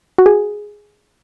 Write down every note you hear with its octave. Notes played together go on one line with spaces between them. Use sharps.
F#4
G#4